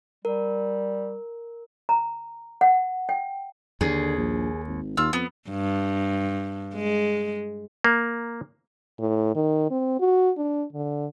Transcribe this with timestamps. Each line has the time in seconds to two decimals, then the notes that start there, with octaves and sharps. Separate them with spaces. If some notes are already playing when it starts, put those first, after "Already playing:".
0.25 G3 A#4
1.89 A#5
2.61 F#5
3.09 G5
3.81 D#2 D3 G#4
4.18 A#1
4.68 G#1
4.97 D#2 F4 E6
5.13 F2 B3
5.50 G2
6.75 G#3
7.84 A#3
8.99 A2
9.35 D#3
9.71 C4
10.00 F#4
10.37 D4
10.73 D3